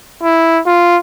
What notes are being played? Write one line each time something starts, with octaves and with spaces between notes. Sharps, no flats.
E4
F4